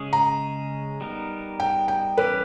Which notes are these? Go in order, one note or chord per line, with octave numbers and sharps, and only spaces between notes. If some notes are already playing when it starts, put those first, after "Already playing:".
Already playing: C#3 G#3 C#4 G#4
A#5
G3 B3 D#4 A#4
G5
G5
E3 G3 C#4 G4 B4